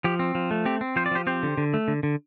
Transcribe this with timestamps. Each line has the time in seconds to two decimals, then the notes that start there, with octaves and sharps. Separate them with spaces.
0.04 F3 G4
0.19 C4
0.35 F3
0.51 A3
0.66 C4 G4
0.81 C4
0.96 F3 C5
1.06 D5
1.11 F3 G4 C5
1.27 C4 G4 C5
1.43 D3
1.58 D3
1.74 A3
1.88 D3
2.03 D3